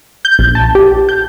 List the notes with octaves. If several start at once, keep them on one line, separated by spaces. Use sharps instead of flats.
G6
A#1
A5
G4
G6